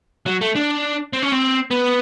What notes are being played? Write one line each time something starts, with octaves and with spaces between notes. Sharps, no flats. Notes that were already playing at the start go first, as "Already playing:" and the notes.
F#3
A3
D4
C4
C#4
C4
B3